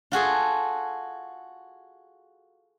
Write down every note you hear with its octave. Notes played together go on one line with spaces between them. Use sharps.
F4 F#4 G#4 A4